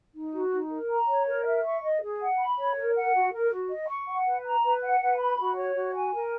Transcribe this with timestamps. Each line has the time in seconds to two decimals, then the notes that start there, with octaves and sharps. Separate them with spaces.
0.14 D#4
0.32 F#4
0.51 D#4
0.69 A#4
0.89 A#5
1.06 C#5
1.26 A#4
1.44 E5
1.64 C#6
1.81 D#5
2.01 G#4
2.20 F#5
2.38 B5
2.57 C#5
2.76 A#4
2.95 F#5
3.14 F#4
3.31 A#4
3.51 F#4
3.69 D#5
3.88 C#6
4.07 F#5
4.26 B4
4.44 A#5
4.63 B4
4.82 F#5
5.00 B4
5.19 B5
5.38 F#4
5.56 C#5
5.75 F#4
5.94 G#5
6.13 A#4